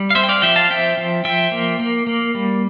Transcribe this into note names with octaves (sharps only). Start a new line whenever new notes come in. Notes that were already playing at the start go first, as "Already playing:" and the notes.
Already playing: G3
F5
C4 C5 E5
G5
D5 F5
F3 E5 G5
F5 A5
C4 E5 G5
F3
F3 E5 G5
A#3
A#3
A#3
G3